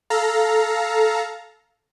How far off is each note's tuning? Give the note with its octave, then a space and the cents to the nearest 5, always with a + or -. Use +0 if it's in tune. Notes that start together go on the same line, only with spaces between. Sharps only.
A4 -10 F5 -5 A#5 +0